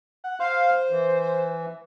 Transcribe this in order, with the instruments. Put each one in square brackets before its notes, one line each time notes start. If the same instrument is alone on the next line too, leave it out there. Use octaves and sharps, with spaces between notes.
[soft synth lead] F#5
[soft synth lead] C5 [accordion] F5
[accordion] E3